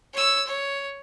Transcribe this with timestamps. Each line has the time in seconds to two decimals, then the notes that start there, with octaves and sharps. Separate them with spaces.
0.13 C#5 E6
0.47 C#5